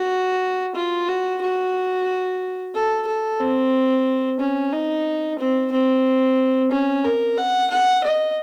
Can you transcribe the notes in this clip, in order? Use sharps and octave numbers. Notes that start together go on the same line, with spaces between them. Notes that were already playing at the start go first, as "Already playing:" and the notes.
Already playing: F#4
F4
F#4
F#4
A4
A4
C4
C#4
D#4
C4
C4
C#4
A#4
F#5
F#5
D#5